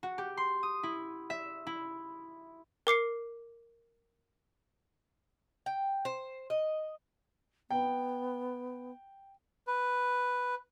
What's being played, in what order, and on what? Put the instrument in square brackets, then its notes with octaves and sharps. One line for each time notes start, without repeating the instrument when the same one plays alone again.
[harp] F#4
G4
C6
D#6
E4
E5
E4
[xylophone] A#4 D6 C7 C#7
[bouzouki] G5
C5
D#5
[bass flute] B3 [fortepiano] G5
[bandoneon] B4